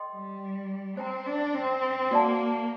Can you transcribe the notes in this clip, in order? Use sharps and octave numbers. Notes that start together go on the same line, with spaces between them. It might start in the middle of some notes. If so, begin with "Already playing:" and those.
Already playing: A4 D#5 G5 C6
G3
C4 C5 G5 A#5
D4
C4
A#3 F#4 A#4 D5 F#5 A5